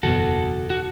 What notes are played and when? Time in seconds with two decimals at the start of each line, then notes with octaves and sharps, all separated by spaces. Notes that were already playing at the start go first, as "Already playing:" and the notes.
0.03 F#1 E2 B2 F#4 A4
0.70 F#4